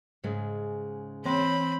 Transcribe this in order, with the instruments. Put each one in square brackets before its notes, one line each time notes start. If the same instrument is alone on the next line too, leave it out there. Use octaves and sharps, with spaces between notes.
[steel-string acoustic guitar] G#2 C#3 G#3
[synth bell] E3 C#5 C6 [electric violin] C4 [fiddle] B5